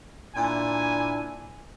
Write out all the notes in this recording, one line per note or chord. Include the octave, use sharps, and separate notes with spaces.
A#2 D4 E4 G#5